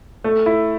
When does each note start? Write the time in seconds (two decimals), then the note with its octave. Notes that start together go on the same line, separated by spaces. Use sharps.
0.24 A3
0.46 E4